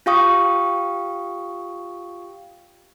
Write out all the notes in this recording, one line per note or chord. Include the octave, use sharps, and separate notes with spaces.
F4 G4 F5 G5 C#6 D#6